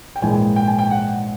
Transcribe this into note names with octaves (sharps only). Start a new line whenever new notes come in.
G5
A#1 G#2 E3 G#3 G#5
G5
G#5
G5
F#5